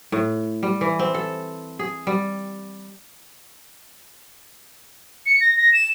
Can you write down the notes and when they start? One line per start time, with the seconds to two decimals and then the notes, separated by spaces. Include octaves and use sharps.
0.12 A2
0.63 G3
0.81 E3
0.99 C4
1.14 A4
1.79 G#4
2.07 G3
5.26 C#7
5.41 A#6
5.57 A#6
5.73 E7